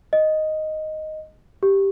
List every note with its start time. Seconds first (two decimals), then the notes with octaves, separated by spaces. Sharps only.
0.13 D#5
1.63 G4